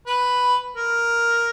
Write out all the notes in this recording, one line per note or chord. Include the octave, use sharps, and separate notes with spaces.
B4
A#4